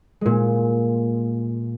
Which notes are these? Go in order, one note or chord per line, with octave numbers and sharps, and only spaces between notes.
A#2 G#3